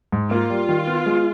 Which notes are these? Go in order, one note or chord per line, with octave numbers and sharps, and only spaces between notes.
G#2
A#3 F4
G3
D#3
B3
G#3